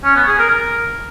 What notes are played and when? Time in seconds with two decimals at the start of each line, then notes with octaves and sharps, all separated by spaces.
0.04 C#4
0.15 B3
0.27 G#4
0.39 A#4
0.50 A#4